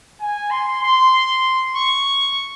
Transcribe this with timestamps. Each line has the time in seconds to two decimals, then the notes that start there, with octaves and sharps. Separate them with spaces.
0.20 G#5
0.51 C6
0.83 C6
1.76 C#6